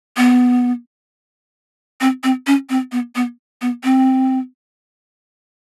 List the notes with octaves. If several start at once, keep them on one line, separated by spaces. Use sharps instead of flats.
B3
C4
C4
C#4
C4
B3
B3
B3
C4